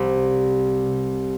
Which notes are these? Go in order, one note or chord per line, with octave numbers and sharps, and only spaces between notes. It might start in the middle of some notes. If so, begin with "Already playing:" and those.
Already playing: C2 C3 G3